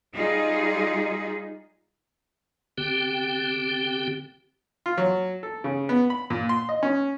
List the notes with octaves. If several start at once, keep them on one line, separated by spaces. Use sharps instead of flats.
G3 D#4 F4 G#4
D3 C4 G4 G5
F4
F#3
A4
C#3
B3
B5
A#2
C6
D#5
C#4